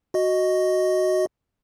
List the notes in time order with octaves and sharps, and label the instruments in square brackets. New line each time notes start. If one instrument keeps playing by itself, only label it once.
[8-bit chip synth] F#4 D#5